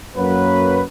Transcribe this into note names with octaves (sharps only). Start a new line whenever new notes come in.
F#2 F#3 A#3 F#4 B4